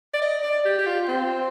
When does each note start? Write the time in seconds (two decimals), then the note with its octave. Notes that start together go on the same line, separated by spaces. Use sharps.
0.14 D5
0.22 D#5
0.43 D5
0.65 G4
0.79 G4
0.86 F4
1.08 C4